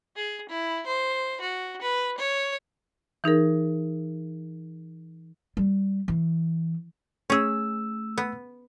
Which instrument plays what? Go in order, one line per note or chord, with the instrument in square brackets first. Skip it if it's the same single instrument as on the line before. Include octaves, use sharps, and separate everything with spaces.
[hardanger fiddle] G#4
E4
C5
F#4
B4
C#5
[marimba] E3 D#4 G#4 A#4
[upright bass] G3
E3
[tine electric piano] A3 E6 [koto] C#4 G#4
[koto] B3